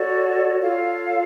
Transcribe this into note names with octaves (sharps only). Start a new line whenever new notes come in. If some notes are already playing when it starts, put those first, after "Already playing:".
Already playing: F#4 A4 C#5 D5
F4 A4 C#5 F5